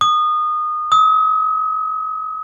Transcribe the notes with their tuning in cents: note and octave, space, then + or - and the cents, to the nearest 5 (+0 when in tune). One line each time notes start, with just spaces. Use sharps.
D#6 -25
D#6 +40